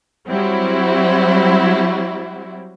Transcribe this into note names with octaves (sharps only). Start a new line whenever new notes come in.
F#3 G3 C4 E4 F#4